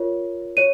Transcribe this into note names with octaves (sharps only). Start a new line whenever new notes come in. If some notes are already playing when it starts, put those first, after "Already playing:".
Already playing: F4 A#4 C#5
C#5 D#7